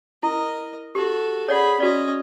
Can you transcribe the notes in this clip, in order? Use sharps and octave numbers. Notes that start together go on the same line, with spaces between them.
E4 A#4 D#5
F#4 G4 A4
G#4 C#5 D5 F#5 B5
C#4 F#4 D5 D#5